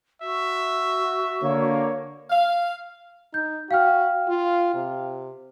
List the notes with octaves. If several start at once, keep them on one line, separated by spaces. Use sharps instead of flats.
F#4 E5
D3 A#3 C#5
F5
D#4 G6
F#4 F5 G5 F6
F4
C3